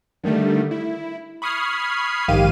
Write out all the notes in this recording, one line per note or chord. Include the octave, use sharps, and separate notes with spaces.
D3 D#3 G3 A3
E4
B5 C#6 D#6 F6 G#6 C7
A#1 G#2 D#3 G4 F5 D#7